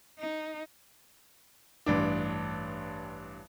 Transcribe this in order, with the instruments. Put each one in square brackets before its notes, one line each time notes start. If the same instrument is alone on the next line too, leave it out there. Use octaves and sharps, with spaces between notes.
[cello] D#4
[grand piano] A1 G2 D4